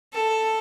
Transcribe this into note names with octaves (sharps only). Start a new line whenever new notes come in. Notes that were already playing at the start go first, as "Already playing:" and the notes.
A4